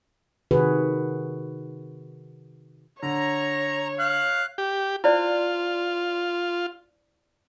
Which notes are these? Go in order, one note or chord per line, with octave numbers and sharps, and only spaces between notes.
C3 D#3 F#4 G#4 B4
D3 C#5 A#5
F5 F#6
G4
E4 F4 C5 D5